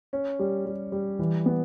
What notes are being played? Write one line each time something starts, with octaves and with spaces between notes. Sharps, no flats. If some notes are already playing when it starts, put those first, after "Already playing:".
C#4
G3
G3
G3
E3
B3